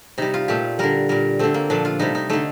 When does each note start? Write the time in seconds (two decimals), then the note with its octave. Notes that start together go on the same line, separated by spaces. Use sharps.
0.18 C3 G3 D#4
0.34 F4
0.48 A#2 A3 G4
0.79 D3 G3 A#4
1.09 A#2 G3 A#4
1.39 D3 A3 C4
1.54 A#3
1.70 A#2 F3 A3 D4
1.85 F4
1.99 C3 G3 D#4
2.15 D#4
2.30 D3 A3 D#4